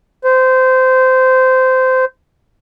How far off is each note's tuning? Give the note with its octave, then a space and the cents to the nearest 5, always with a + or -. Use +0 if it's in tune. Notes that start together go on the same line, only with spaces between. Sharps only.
C5 -20